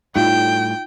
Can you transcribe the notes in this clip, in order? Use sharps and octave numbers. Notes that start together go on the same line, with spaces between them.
A2 G3 D#4 F4 G5